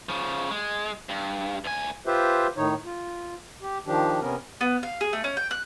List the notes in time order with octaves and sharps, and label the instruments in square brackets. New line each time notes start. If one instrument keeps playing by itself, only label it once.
[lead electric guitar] C#3 F3
G#3
G2
D2 G#5
[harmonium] F4 G4 B4 C5 E5
A2 D#3 D#4 C#5
F4
G4
D#3 F3 D4 G4
C3 B3 C#4 A#4
[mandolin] B3
F5
G#4
A3
C#4
G5
F#6